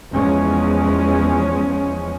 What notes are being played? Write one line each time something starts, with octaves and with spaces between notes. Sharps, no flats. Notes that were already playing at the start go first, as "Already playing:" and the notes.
E2 F3 G#3 C#4